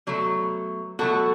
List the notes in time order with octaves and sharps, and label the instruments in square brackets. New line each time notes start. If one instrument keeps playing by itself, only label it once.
[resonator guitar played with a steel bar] B2 F#3 A3
B2 F#3 A3 F#4 A4